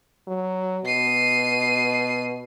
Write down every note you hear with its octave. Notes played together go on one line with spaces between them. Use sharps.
F#3
B2 C7 D#7